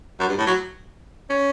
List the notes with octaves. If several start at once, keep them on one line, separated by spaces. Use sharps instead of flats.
F#2
G2
A2
F#3
C#4